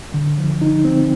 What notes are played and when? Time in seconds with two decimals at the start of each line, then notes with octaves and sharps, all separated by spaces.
0.14 D3
0.38 F3
0.62 D#4
0.85 C4